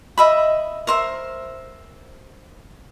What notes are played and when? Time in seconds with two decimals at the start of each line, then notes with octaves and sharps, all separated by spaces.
0.18 D#5 E5 B5
0.87 A#4 C5 E5